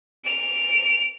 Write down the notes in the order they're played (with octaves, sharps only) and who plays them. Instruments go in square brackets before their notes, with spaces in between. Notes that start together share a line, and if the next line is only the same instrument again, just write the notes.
[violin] D7 F7